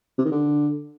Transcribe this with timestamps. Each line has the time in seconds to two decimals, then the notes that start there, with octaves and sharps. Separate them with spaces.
0.18 C3
0.25 D#3
0.31 D3